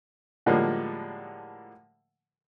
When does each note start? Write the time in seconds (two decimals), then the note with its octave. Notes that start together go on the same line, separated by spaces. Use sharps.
0.46 A2 D3 F3 G3 G#3 A#3